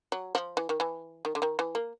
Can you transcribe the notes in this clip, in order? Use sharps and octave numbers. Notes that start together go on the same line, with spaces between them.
F#3
F3
E3
D#3
E3
D#3
D3
D#3
E3
A#3